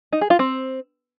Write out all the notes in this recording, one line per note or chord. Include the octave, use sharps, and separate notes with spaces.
D#4
G#4
F4
C4